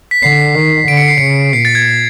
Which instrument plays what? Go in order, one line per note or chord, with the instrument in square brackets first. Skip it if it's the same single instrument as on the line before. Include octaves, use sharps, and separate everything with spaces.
[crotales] B6
[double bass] D3 [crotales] C7
[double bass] D#3
[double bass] D3 [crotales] D7
[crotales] C#7
C7
[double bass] C#3 [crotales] C#7
[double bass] A#2 [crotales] C7
[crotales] A6
G#6